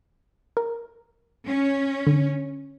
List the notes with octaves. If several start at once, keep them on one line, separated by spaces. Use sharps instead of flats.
A#4
C#4
D3